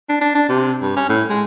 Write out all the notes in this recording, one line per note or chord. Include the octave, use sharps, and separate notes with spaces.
D4
D4
D4
C3
G2
C#4
A2
G#3